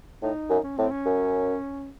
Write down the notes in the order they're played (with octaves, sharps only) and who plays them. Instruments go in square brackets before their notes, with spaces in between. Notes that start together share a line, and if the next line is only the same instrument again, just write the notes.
[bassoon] A2 [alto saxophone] D#4
[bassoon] F#2
[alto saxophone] C#4
[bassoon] A2 [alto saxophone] C4
[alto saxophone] C#4
[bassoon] F#2